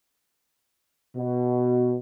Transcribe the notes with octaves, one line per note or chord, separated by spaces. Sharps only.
B2